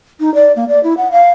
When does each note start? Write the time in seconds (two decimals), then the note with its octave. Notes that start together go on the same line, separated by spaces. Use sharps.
0.20 D#4
0.35 D5
0.56 A#3
0.69 D5
0.83 E4
0.97 F#5
1.12 F5